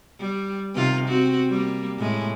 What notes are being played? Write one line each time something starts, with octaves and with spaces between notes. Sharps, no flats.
G3
C3 D#3 F4
C4 F#4
G3 A#3
A2 G#3